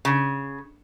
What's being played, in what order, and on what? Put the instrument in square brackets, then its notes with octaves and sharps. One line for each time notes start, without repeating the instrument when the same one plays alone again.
[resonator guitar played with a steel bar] C#3